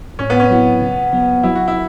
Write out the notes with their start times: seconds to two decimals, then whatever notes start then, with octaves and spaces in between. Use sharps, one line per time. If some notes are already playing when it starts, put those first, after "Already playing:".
0.19 A2 C#4
0.30 B3
0.40 C#4
0.50 F#3 B3 E4
0.81 C#3
1.13 F#3 B3
1.43 F#3 E4
1.55 F#4
1.68 E4